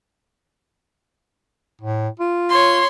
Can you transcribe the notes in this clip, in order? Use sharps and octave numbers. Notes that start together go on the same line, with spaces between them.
A2
F4
C#5 C6